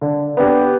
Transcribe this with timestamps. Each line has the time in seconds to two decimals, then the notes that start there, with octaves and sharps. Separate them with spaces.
0.01 D3
0.37 B3 D4 G4